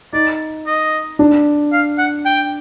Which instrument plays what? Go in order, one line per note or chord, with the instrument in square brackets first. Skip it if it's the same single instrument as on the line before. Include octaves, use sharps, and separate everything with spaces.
[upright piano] D#4 [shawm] D5
[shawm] D#5
[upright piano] D4
[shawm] F5
F#5
G5